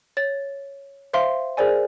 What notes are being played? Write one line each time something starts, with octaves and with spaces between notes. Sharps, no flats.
C#5 A6
C5 E5 F5 C6
G#4 A#4 C5 D5 G#5